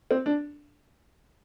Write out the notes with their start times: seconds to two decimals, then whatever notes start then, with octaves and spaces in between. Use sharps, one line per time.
0.11 C4
0.26 D4